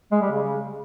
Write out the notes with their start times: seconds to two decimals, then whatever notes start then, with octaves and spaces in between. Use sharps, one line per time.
0.12 G#3
0.22 G3
0.31 C#3